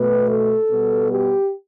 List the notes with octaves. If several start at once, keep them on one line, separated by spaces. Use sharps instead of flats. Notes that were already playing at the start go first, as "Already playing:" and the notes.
Already playing: B2 A3 B4
A4
B2 G3 B3
G4